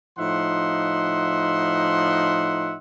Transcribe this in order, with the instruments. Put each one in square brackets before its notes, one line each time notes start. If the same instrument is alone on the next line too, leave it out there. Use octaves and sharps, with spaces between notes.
[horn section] A2 F3 D#4 E5 F#5 C6